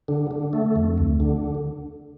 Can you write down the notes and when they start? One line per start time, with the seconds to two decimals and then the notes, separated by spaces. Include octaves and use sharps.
0.08 D3
0.31 D3
0.53 A3
0.76 F2
0.98 D2
1.20 D3